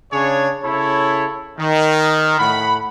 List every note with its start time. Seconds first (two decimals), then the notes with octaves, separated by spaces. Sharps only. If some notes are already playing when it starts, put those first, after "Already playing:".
0.12 C#3 D4 G#4 C#5
0.63 C#3 E4 A4 C#5 B5
1.59 D#3
2.39 A2 F#5 B5